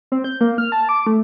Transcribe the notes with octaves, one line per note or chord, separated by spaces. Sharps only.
C4
G6
A#3
F6
A5
D6
A3